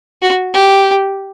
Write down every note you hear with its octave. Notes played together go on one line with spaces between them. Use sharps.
F#4
G4